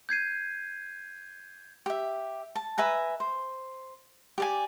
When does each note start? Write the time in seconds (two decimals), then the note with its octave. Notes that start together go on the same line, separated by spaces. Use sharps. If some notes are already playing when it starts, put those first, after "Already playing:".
0.09 G6 G#6 C7 D#7
1.86 G4 E5
2.55 A5
2.78 B4 E5 G#5 A#5
3.20 C5
4.38 G4 D5 G#5